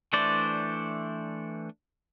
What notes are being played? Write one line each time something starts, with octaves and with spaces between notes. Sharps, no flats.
E3 A3 D4 C5 D5